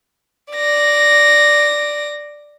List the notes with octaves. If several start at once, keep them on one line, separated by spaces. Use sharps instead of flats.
D5 A#6